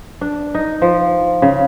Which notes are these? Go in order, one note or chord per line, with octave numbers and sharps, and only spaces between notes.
D4
D#4
F3
C#3